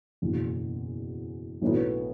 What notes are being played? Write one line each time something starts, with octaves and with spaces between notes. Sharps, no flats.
F#1 E2 B2
B1 A2 F#3 B3